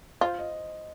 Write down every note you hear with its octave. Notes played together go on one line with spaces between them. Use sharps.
F4 C5
D#5